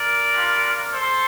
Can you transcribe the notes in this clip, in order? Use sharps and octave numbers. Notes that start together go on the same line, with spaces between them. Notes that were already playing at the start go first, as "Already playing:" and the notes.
Already playing: A#4 D5
G3 D4 F4
A4 C5